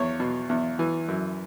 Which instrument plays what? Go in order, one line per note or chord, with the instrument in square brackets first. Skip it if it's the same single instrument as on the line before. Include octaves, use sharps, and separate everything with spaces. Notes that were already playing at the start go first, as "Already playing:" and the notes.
Already playing: [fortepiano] E2 C#5
B2
E2
E3
F#2